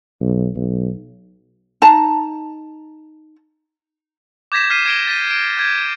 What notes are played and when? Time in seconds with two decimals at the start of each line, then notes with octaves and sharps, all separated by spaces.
0.20 B1
0.56 B1
1.82 D#4 A5 A#5
4.52 D6 G6 G#6 A#6 B6 E7
4.70 F6 B6 C7 D#7
4.85 G#6 D7 G7
5.07 A6 B6 D#7
5.31 D7
5.57 G6 G#6